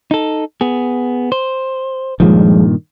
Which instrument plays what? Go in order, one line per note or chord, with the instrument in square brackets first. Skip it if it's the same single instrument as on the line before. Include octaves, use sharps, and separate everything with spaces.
[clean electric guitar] D#4 A4
B3 G#4
C5
[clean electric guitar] G2 A#2 D#3 [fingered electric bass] F3 G#3